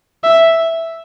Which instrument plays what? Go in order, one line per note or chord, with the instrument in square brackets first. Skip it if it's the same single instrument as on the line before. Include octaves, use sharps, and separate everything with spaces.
[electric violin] E5